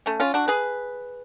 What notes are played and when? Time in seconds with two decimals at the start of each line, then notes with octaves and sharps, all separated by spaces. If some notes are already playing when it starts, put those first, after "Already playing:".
0.06 A3 C#4
0.20 C#4 F4
0.34 D4 F#4
0.48 G#4 B4